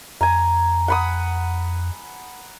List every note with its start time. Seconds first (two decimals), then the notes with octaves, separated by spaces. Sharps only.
0.21 F2 G#5 A#5
0.88 F#5 B5 D#6